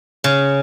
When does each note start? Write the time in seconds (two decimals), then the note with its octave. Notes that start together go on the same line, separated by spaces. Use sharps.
0.24 C#3